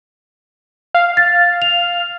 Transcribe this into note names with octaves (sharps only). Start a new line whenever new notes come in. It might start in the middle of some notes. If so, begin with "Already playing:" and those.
F5
A6
F7